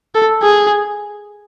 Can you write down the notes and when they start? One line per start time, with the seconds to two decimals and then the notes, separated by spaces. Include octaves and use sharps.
0.15 A4
0.43 G#4